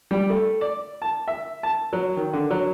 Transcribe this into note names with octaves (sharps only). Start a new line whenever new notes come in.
G3
A3
D5
A5
E5
A5
F#3
D#3
D3
F#3